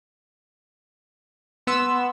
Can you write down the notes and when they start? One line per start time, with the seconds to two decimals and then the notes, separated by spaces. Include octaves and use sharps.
1.67 B3 C6 E6